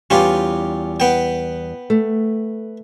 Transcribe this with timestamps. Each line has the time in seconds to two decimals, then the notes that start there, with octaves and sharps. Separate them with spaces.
0.10 E2 G3 C#4 F4 G4
1.00 B3 G5
1.90 A3